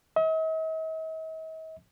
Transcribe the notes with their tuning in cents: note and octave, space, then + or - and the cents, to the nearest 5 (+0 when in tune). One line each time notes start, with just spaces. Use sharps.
D#5 +45